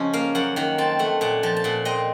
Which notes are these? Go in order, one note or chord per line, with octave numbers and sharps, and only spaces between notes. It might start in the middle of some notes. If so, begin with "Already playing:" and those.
Already playing: C#3 F3 C#4 D#5
A#3 F5
F#2 F#5
D#3 F#5
C4 A5
A3 F#5
A#2 F#5
F3 A5
A5
A#2 F#5
C4 D#5